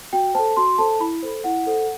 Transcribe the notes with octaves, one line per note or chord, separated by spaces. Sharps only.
F#4 G5
A4 C5 A5
F#4 C6
A4 C5 A5
E4 B5
A4 C5
E4 F#5
A4 C5